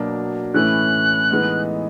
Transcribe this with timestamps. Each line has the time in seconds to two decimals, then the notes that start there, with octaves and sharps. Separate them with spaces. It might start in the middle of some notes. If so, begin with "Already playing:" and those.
Already playing: B2 F#3 A#3 D4
0.54 A2 E3 A3 C#4 E4 F#6
1.30 A2 E3 G#3 B3 D#4